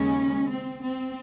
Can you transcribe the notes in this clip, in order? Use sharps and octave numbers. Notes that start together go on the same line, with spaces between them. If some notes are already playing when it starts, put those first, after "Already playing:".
Already playing: D#2 C#3 G#3 C#4
C4
C4